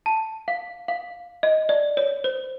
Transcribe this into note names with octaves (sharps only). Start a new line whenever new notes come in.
A5
F5
F5
D#5
D5
C#5
C5